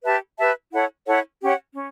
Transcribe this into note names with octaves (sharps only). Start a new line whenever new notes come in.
G4 B4 E5 A5
G4 B4 E5 A5
E4 A4 C#5 F#5
E4 A4 C#5 F#5
C#4 G4 C#5 F#5
C#4